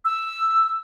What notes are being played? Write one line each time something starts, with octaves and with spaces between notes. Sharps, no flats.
E6